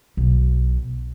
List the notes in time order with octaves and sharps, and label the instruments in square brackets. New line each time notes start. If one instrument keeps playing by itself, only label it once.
[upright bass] B1